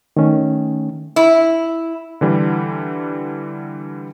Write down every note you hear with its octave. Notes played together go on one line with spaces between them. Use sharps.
D#3 A3 C#4
E4
D3 E3 G3